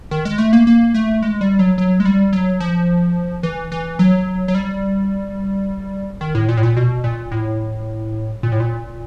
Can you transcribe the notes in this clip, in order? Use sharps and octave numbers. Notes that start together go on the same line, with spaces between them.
D#3
G#3
A3
A#3
A#3
A3
G#3
G3
F#3
F#3
G#3
G3
F#3
F3
E3
E3
F#3
F#3
G3
D#3
A2
A#2
A2
A#2
B2
A#2
A2
A#2
A2
A#2